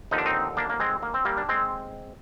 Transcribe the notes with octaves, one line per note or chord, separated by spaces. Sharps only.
D#2 D3 F3 D#4
D4
C4 D#4
A#3 D4
A#3
G#3 C4
A#3
C4
G3 A#3
D4
G#3 C4